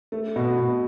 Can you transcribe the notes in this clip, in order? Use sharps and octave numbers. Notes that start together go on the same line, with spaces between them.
A3
B2
B2